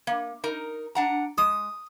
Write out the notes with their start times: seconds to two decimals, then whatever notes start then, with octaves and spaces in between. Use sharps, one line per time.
0.07 A#3
0.44 D#4 A#4
0.95 D4 F#5 A#5
1.38 G#3 D#6